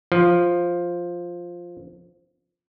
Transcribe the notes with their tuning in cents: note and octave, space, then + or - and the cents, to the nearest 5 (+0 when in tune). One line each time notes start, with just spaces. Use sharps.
F3 +0